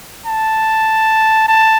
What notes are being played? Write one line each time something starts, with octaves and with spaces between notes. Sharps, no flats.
A5
A5